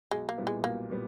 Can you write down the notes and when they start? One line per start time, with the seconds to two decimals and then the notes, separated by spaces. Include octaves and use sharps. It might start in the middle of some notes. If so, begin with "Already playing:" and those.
0.11 B1 G#3
0.29 A#3
0.37 A#2 G3 B3 E4
0.47 G#3
0.64 B1 A#3
0.90 A#2 G3 B3